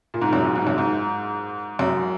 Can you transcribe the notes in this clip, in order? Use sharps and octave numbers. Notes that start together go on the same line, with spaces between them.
A#2
G#2
F#2
G#2
G#2
F#2
G#2
F#2